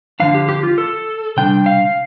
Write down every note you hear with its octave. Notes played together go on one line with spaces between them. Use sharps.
D3 F3 D4 F5
G4
G4
F4
A4
C3 G3 D4 G5
F5